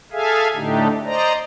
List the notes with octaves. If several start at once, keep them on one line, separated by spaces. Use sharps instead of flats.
G#4 A4 E5 F5 G#5
A2 D3 A3 D4 D#4 G4
C5 D5 D#5 A#5